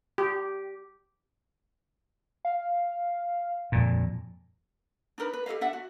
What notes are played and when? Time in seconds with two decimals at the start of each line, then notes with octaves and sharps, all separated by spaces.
0.18 G4
2.45 F5
3.72 F2 A#2
5.18 D4 D#4 A#4 B4
5.33 B4
5.46 G4 A4 D#5 F5
5.61 D4 E5 F#5
5.73 F#4